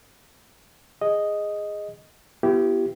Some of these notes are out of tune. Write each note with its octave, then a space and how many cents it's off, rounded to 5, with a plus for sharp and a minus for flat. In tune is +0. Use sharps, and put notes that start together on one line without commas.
G#4 -5 D#5 +0
B3 +0 E4 +35 G4 -15